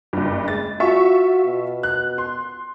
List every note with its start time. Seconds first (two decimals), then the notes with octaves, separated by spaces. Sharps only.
0.13 F#1 G2
0.48 G#3 A6
0.80 F4 F#4 E5 C#6
1.45 B2
1.83 F#6
2.18 C6